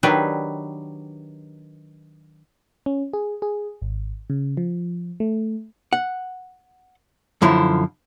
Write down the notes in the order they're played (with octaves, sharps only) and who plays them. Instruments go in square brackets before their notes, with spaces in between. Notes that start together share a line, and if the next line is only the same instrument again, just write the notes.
[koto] D#3 F#3 D4 G4 B4 E5
[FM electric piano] C#4
G#4
G#4
G#1
C#3
F3
A3
[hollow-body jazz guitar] F#5
F#2 D3 F3 E4